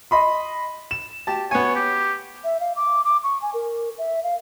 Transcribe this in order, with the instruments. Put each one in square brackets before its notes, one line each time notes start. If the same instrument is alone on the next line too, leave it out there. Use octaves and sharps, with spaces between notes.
[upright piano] D#5 B5 C6
E7
[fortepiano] G4 A5
[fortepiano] B3 G#5 [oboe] C#5
[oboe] G4
[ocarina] E5
F5
D6
D6
C#6
G#5
A#4
E5
F5